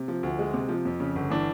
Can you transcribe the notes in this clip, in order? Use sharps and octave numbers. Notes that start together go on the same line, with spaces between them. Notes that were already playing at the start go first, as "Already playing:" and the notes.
Already playing: C3
F3
D2
G#3
C3
F3
F2
C#3
G1
E3 D4